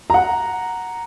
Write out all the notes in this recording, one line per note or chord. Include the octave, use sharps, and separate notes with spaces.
F#5 A#5